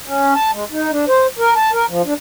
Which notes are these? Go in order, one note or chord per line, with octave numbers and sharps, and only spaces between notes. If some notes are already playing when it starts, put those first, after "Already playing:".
C#4
A5
G#3
D#4
D4
C5
A#4
A5
A#4
F3
D4